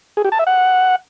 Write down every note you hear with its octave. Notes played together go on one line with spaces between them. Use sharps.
G#4
G4
A5
E5
F#5